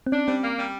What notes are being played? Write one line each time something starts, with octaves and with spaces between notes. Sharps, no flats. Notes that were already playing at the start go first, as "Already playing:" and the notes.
C4
C#4 D4
G3 C4
A#3
G3